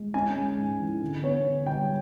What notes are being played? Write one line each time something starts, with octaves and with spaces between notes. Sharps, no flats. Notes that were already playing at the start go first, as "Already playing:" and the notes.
Already playing: G#3
C#4 G#5
G#3
G#2
E3
D3
B3 C#5
D3
G3 G5